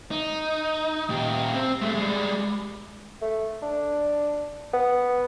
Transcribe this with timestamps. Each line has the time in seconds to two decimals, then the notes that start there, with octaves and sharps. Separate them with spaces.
0.11 D#4
1.10 A#2 G4
1.54 C4
1.81 G#3 A3
1.95 G3 G#3
3.21 A3
3.62 D4
4.73 B3